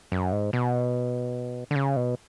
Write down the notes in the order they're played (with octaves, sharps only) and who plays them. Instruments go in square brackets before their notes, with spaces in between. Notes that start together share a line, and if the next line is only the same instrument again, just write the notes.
[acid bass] F#2
G#2
B2
D3
C#3
B2